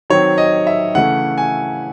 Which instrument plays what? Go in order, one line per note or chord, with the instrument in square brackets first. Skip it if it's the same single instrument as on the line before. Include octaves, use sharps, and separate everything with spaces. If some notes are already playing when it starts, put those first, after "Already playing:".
[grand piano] D#3 F#3 C4 C#5
D#5
E5
C#3 E3 A3 C#4 F#5
G#5